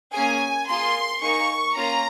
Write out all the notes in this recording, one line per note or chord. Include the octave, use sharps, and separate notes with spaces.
A#3 C#4 G#4 G#5
A#3 F4 G#4 C6
A#3 D#4 G#4 C#6
A#3 C#4 F4 A#5